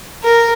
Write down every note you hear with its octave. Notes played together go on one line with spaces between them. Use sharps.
A#4